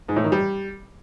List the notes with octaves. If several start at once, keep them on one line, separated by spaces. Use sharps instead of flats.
G#2
A2
D#3
G3